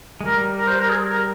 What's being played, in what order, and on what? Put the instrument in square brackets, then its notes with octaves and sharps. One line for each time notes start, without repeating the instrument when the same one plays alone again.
[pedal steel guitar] G#3
[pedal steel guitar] G3 [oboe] A#4
[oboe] A#4
C5
A#4
G#4
A#4